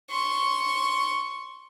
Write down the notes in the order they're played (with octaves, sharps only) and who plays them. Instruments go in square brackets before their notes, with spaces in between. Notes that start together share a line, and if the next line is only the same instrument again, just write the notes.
[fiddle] C6 C#6